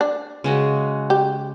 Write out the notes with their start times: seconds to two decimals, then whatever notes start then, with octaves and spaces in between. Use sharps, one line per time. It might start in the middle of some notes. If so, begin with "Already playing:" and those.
0.01 D4
0.44 C#3 G#3 F#4
1.10 G4